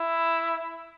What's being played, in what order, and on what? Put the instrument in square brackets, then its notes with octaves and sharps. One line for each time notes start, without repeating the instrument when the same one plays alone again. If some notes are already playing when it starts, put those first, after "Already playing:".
Already playing: [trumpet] E4